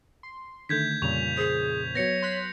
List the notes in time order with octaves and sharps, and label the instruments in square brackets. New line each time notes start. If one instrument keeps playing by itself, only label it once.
[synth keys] C6
[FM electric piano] D3 D#3 A3 [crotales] G6 G#6 B6
[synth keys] F2 A#2 C#3 [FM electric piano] G3 [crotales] C#6 F7
[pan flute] G#4 [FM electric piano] C5
[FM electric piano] F#3 B3 [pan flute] C#5 [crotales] A#6 C#7
[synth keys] C6 F#6 B6